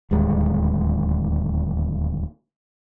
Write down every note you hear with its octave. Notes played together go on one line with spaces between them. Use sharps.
D1 D#2 G3 G#3